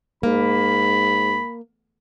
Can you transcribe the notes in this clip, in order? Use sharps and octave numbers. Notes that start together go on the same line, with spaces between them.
G#2 A#3 B5